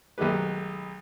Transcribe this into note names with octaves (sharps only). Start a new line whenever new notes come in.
B1 D#3 G#3 A3 G4 B4